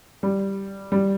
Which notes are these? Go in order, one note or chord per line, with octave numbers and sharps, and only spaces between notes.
G3
G3